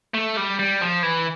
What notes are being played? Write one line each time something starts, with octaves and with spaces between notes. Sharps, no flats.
A3
G3
G3
F3
E3